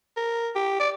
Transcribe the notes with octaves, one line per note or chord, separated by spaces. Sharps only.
A#4
G4
D5